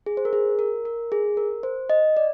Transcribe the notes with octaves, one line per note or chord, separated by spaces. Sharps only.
G#4
C5
A#4
G#4
A#4
A#4
G#4
A#4
C5
D#5
D5